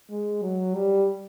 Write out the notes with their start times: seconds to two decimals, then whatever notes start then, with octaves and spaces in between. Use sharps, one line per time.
0.10 G#3
0.42 F#3
0.74 G3